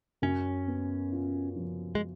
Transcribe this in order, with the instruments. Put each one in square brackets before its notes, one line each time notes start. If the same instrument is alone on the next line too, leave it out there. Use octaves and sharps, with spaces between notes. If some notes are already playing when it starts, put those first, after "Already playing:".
[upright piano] F#2 [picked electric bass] C#4
[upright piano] B3
F4
F3
[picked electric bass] G#3